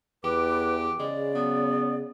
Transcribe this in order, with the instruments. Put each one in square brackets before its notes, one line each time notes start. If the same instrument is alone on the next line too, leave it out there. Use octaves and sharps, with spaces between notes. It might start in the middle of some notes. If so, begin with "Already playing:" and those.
[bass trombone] E2 [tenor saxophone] G4 [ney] B4 [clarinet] D6
[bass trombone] C#3 [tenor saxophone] G#3 [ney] D5
[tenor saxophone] F#3 [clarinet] B3